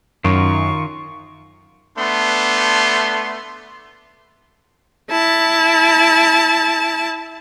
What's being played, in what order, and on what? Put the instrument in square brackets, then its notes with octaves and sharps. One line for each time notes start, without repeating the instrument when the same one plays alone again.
[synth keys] F#2 [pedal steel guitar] D#3 F4 [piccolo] C#6
[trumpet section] A3 B3 D4 C6
[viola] E4 A5